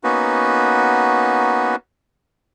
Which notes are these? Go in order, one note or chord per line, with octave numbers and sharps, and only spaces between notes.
A#3 B3 C#4 D#4 F#4 B4